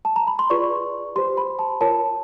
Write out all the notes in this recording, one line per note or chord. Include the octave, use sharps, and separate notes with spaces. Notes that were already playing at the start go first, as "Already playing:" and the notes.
A5
A#5
B5
C6
F4 G#4 B4 D5 C#6
G4 C5 C6
B5
A5
F4 A#4 C#5 A5